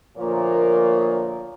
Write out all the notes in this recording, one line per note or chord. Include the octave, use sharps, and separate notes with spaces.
D2 A#2 F3 A#3 A#4 C#5